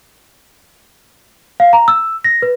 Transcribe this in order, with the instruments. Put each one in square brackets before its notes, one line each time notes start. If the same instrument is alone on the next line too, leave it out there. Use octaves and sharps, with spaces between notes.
[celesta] F5
A#5
E6
A#6
B4